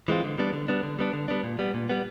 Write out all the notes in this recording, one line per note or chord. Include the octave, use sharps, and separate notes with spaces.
E3 G#3 C4 F4
D3
G3 B3 D4
D3
G3 B3 D4
D3
G3 B3 D4
D3
G3 B3 D4
A#2
G3 B3
A#2
G3 B3